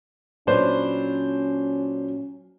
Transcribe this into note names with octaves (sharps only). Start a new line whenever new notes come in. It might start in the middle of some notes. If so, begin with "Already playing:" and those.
A#2 F#3 C#4 D4 B4 C5